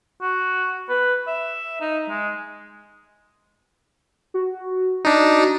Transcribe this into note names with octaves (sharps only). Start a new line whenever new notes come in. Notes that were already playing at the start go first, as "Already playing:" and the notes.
F#4
B4
E5
D#4
G#3
F#4
D4 D#4